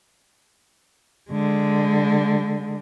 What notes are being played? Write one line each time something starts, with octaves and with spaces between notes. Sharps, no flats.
D3 G#3